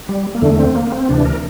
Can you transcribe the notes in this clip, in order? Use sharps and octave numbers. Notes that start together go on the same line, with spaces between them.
G3
A#3
E2 D3 A3
C4
A#3
C4
D2 C3 E3 D4
A#4